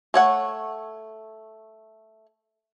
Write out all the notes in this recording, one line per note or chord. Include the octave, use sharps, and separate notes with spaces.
A3 C#5 F#5